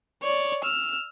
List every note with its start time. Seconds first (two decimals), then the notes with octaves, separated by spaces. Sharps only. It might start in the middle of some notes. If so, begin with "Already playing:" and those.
0.23 C#5 D5
0.64 E6 F6